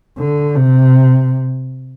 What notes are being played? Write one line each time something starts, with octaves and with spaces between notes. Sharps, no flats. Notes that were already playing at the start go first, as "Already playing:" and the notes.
D3
C3